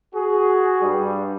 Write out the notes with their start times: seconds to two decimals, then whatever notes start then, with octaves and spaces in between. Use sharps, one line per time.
0.13 F#4 G#4
0.81 G2 G3